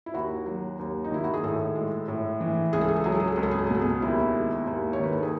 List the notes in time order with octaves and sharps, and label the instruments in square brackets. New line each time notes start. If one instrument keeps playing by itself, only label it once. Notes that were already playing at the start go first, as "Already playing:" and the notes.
[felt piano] E4
D#2 F#4
F#3
D#2
D#4
D#3 E4
F#4
G#4
A2 A4
G#3
A2
E3
C#2 G#4
A4
G#4
A4
F#3 G#4
A4
G#4
A4
C#2 G#4
A4
G#4
A4
G#4
B2 A4
G#4
D#2 E4
G#3
D#2
C#5
D#3 B4
A4
G#4